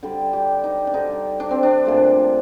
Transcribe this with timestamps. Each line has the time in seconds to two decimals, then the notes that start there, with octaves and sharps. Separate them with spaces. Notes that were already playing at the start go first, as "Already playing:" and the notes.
0.03 D3 G3
0.33 G4
0.64 D#4
0.87 D4
0.94 D3 G3 D#4
1.40 D4
1.51 C4
1.63 D4
1.85 A#2 F3 A3